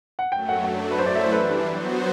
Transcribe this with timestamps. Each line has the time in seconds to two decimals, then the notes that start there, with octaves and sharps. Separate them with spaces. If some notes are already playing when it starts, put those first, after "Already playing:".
0.19 F#5
0.32 F#2 F#3 A3 G5
0.49 F#5
0.64 F#3 A3 D4 F#5
0.91 B4
0.98 F#2 F#3 A3 E4 A4 C5
1.06 D5
1.15 E5
1.23 C5
1.32 E3 G3 D4 B4
1.48 B4
1.66 F#3 B3 F#4 C5